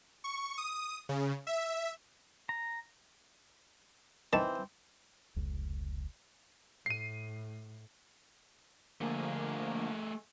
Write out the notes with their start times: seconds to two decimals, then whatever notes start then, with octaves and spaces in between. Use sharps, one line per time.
0.24 C#6
0.58 D#6
1.09 C#3
1.47 E5
2.49 A#5
4.33 D#3 E3 C4 A5
5.36 F1 C#2
6.86 A2 C7 D#7
9.01 D3 F3 A3 A#3 G#4